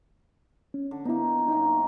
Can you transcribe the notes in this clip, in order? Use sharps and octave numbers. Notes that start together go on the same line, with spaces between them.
C#4
D3
A#3 B3 D#4 E4
F#2 D#4 G5 A#5